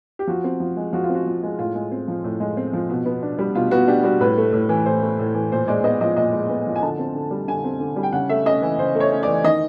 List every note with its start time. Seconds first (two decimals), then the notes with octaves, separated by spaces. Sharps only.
0.19 G4
0.28 F3 F#4
0.44 C4
0.60 F3
0.77 G#3
0.93 F3 F#4
1.04 F4
1.09 C4
1.15 F#4
1.26 F3
1.43 G#3
1.59 A2 F4
1.75 G#3
1.92 C4
2.08 F3
2.24 A2
2.40 G#3
2.57 C4
2.73 F3
2.89 B2
3.06 B3
3.23 D4
3.39 G3
3.55 B2 F4
3.71 B3 F#4
3.88 D4 G4
4.04 G3 F#4
4.21 A2 B4
4.38 A3
4.53 A2
4.69 E3
4.86 A2 C5
5.02 A3
5.19 A2
5.34 E3
5.51 A#2 C5
5.68 G#3 D5
5.84 B3 D#5
6.01 F3 D#5
6.16 A#2 D#5
6.33 G#3
6.49 B3
6.67 F3
6.76 G#5
6.83 D3 A5
6.99 C4
7.15 D3
7.31 G3
7.48 D3 G#5
7.64 C4
7.80 D3
7.96 G3
8.03 G5
8.13 C#3 F#5
8.29 A3 E5
8.45 C#4 D#5
8.62 E3
8.78 C#3 C5
8.95 A3
9.00 C#5
9.12 C#4
9.23 E3 D5
9.44 D#3 D#5